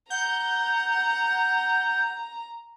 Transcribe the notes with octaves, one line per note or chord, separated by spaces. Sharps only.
F#5 A#5 G6